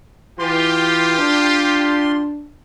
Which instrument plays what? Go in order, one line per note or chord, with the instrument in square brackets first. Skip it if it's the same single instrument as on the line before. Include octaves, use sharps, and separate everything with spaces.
[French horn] E3 [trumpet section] F4 G4 [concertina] C6
[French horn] D4